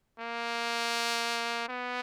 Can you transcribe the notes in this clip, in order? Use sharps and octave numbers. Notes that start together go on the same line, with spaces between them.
A#3
B3